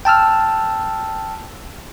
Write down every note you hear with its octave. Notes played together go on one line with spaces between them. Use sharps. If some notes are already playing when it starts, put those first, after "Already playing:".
G5 A5 E6 F6